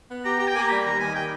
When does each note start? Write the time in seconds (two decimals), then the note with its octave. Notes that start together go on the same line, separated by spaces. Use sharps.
0.09 B3
0.24 G4 A#5
0.38 G4 A#5
0.48 G5
0.54 A#3 G#5
0.62 A#5
0.69 G3 B5
0.84 D#2 A#5
0.99 D#3 G#5
1.15 G3 G5